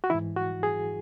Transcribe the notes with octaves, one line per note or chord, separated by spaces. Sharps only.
F#4
G#2 E3 E4
F#4
G#4